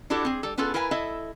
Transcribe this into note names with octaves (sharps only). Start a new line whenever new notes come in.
D4 E4 F#4 G4 A4
C4 G#4
G3 A4
B3 C#4 F4 G#4 A4 B4
E4 A#4 B4 F5 G#5
E4 A4 D#5 E5